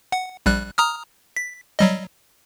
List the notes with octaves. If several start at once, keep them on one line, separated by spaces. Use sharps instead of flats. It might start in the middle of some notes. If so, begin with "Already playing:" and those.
F#5
A#1 G3 F#6
A#5 D#6 F6
B6
F#3 G3 D#5